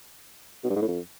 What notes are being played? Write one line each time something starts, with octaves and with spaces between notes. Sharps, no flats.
B2
G2
G#2
A2
F2